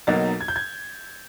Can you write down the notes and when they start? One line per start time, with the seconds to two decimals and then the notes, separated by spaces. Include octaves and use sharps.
0.07 B1 B2 F#3 A#3 D#4 A6
0.41 G#6
0.48 G6
0.56 G#6